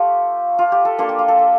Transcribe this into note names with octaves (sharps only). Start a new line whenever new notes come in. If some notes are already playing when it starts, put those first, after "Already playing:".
Already playing: A3 F4 G4 A4
F4
G4
A4
A#3 D4 F4 A4
G4
F4
A4
A4